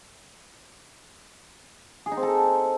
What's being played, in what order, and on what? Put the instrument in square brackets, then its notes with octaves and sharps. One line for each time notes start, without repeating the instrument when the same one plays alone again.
[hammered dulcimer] G#4
D#4
C4
A4